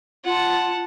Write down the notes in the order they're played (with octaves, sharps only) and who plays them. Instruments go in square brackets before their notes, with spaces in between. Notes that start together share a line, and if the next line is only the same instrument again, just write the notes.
[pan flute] F4 [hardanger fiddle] F#5 A5